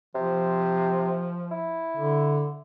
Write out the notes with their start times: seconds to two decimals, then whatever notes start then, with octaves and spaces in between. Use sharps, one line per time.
0.15 C3 F3
1.52 E4
1.96 D3